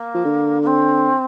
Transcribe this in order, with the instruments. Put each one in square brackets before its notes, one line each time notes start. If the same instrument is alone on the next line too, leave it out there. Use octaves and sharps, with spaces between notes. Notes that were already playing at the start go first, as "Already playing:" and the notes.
Already playing: [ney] A#3
[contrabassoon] F3
D3
[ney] A#3
C4